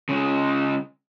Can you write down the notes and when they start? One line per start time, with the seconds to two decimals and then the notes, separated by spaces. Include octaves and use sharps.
0.09 C#3 G#3